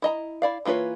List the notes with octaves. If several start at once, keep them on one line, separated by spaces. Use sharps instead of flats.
E4 D#5 A#5
E4 D5 F5
E3 A#3 F4 B4 C#5